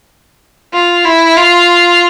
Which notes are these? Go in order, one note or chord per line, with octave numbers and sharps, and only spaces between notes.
F4
E4
F4